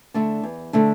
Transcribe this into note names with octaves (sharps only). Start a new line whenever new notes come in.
D3 A3 D4
E2
D3 A3 D4